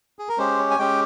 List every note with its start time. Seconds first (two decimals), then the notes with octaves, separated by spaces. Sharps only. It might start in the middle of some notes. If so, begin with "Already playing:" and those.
0.19 G#4
0.29 A#4
0.38 G#3 C#4 G4 C5
0.59 C#5
0.71 G#5
0.79 G#3 C#4 G4 G5